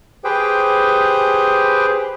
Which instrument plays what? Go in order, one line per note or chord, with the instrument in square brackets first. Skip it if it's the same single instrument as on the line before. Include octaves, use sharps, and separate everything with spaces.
[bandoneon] G4 G#4 B4 C5 G5